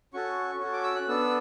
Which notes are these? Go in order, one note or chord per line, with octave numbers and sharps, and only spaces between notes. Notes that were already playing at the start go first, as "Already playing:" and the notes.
C#4 F#4 A4 C#6
C#4 F#4 A4 C#6
D6
E6
F#6
B3 D4 A4 E6